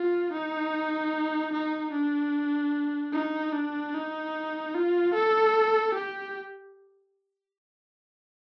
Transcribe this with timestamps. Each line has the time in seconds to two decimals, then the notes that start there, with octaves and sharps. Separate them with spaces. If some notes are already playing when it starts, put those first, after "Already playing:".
Already playing: F4
0.32 D#4
1.52 D#4
1.92 D4
3.13 D#4
3.53 D4
3.94 D#4
4.75 F4
5.14 A4
5.95 G4